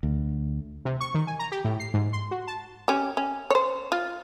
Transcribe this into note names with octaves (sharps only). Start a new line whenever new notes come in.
D2
C3
C#6
D#3
G#5
A#5
G4
A2
C7
G#2
C6
F#4
A5
C#4 G4
C#4
C5 C#5
F4